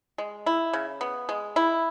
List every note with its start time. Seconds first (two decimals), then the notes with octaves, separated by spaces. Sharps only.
0.18 G#3
0.46 E4
0.73 C#3
1.01 B3
1.29 G#3
1.56 E4